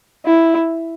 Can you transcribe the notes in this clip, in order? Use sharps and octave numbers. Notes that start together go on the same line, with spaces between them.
E4